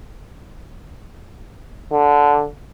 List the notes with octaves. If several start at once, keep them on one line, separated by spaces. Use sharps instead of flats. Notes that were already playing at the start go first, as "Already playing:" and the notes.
D3